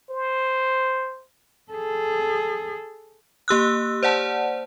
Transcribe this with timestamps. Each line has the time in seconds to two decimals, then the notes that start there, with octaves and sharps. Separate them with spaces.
0.10 C5
1.73 G#4 A4
3.48 A#3 G4 E6 F#6
4.03 C5 D5 F#5 A5